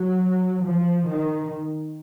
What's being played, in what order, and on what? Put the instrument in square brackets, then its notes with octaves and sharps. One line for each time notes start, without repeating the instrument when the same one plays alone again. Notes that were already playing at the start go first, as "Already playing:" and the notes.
Already playing: [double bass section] F#3
F3
D#3